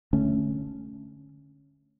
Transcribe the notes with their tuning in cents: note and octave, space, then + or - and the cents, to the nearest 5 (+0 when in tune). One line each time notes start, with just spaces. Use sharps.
D3 +0 A3 -10 C#4 +0